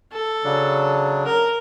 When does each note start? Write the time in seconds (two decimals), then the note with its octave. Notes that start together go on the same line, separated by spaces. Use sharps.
0.12 A4
0.44 C#3 F#3 D4
1.26 A#4